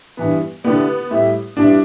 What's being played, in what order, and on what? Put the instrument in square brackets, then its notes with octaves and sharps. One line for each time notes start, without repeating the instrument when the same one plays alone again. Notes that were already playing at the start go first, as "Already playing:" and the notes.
[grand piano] G2 E3 B3
[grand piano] D3 A3 E4 G4 D5 [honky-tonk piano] B3
[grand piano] A2 G3 E4 G4 E5
[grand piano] G2 G3 B3 E4 [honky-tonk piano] D4